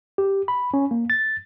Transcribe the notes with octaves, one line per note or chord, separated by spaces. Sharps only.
G4
B5
C#4
A#3
A6